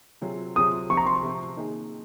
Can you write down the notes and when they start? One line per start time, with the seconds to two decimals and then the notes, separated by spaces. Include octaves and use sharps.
0.21 C3 F#3 C4 F4 G#4
0.56 C3 F#3 C4 F4 G#4 D#6
0.90 C3 F3 C4 C#6
0.97 A#5
1.06 C6
1.15 C#6
1.23 C3 F3 C4
1.57 D#3 A#3 D#4 G#4